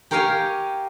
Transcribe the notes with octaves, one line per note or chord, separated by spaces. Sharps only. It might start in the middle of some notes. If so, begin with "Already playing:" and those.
G4 A#4 C#5 F5 G5 G#5